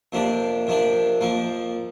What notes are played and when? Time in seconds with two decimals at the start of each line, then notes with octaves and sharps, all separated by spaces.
0.12 F2 C3 A#3 D4
0.67 F2 C3 A#3 D4
1.21 F2 F3 A#3